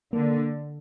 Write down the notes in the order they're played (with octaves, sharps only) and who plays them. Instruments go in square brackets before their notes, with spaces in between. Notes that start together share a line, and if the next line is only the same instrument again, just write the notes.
[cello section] D3 [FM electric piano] A#3